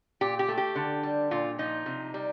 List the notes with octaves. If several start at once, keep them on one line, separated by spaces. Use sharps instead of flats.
A#2 G4
G4
A3
G4
D3
G3
A#2 F4
F3 D#4
C3
G3